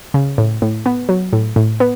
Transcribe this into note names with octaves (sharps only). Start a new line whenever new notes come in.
C#3
A2
A2
B3
F#3
A2
A2
B3